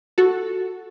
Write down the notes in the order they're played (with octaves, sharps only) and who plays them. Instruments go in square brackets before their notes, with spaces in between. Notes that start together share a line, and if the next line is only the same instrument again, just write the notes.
[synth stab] F#4 A4